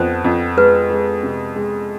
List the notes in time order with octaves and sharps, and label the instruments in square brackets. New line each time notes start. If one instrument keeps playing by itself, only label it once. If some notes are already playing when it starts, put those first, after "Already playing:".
Already playing: [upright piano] F2 B3 [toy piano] C5
[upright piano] F2
[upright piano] G#3 [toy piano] B4
[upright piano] G#3
C3
G#3